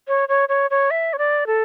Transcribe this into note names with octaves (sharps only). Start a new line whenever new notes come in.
C#5
C#5
C#5
C#5
E5
C#5
D5
A4